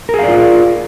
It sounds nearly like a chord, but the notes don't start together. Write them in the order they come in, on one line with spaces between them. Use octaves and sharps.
A#4 G#4 F5 D5 F4